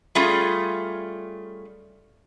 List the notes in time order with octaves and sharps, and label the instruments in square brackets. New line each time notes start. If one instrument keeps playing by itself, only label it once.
[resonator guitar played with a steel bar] G3 A3 C#4 F4 G#4